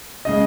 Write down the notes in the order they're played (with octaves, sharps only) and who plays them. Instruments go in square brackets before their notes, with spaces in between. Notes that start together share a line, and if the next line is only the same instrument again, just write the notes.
[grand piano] C#3 G#3 D#5